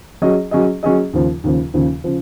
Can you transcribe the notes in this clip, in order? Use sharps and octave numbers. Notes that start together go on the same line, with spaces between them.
F#3 C#4 G#4 D#5
F#3 C#4 G#4 D#5
F#3 C#4 G#4 D#5
D#2 C#3 F3
D#2 C#3 F3
D#2 C#3 F3
C#3 F3